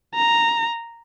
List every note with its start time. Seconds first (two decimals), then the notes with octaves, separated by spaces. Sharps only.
0.15 A#5